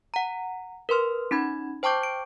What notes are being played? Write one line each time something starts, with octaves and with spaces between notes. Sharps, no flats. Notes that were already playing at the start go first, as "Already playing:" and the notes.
F#5 A#5
A#4 B4 C6 F6
C#4 D#4 B5 G#6
C5 G5 A5 C#6 D6 G6
D7